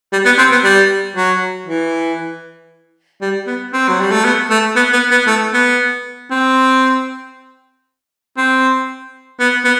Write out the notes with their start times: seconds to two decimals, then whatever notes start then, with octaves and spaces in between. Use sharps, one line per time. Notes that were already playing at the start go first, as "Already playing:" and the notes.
0.12 G3
0.25 B3
0.38 C4
0.52 B3
0.64 G3
1.16 F#3
1.67 E3
3.21 G3
3.47 B3
3.73 C4
3.89 F#3
4.01 G3
4.12 A3
4.24 B3
4.50 A3
4.76 B3
4.93 B3
5.11 B3
5.27 A3
5.54 B3
6.31 C4
8.37 C4
9.40 B3
9.65 B3